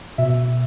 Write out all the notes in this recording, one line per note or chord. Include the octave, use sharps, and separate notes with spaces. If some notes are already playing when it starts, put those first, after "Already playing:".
B2 E5